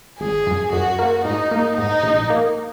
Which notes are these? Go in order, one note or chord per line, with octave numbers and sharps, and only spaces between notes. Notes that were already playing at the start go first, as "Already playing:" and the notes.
G#1 G#4
F#2
F#2 F#4
A#3
G#2 D#4
A#3
G#2 D#4
A#1
A#3